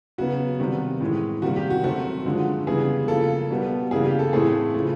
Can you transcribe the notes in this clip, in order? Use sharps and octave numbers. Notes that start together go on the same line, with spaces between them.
C#3 F#3 B3 F#4
C3 D#3 G3
A2 E3 G#3
C3 D#3 G3 A#3 F#4
G4
F#4
D#3 F#3 A3 C4 F#4
D3 F3 G#3
C#3 E3 G3 B3 G#4
C#3 F3 A#3 A4
B2 G3 B3
C#3 E3 G3 A#3 G#4
G4
A4
A2 E3 A3 C4 G#4
C#3 F3 A3